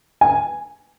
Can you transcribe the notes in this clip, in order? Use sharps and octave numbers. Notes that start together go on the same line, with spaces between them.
G#5